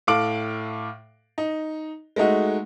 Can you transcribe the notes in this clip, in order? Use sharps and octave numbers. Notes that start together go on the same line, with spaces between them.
A2 A4 F5 D6 D7 F#7
D#4
G#3 A3 D#4 F#4